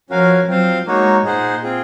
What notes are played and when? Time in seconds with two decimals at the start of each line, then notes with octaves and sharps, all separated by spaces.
0.09 F3 C#4 F#4 A#4 F5 G#5
0.47 F#3 C4 F4 C5 F5
0.86 G#3 A#3 D#4 F#4 C#5
1.24 A#2 D#4 G#4 C5 F#5
1.62 C4 F4 G#4